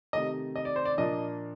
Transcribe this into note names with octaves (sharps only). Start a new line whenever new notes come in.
C3 D#3 A3 D#5
D#5
D5
C5
D5
A#2 F3 A#3 D4 D#5